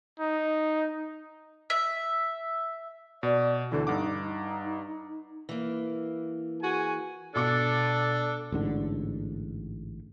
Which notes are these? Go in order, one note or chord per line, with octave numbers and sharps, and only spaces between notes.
D#4
E5
B2 D5
D2 D3 E3 A4
G2 D#4 F#5 D6
E3 A#3
F#4 G#4 G#5
B2 D4 A4 D6 C#7
A1 G#2 D3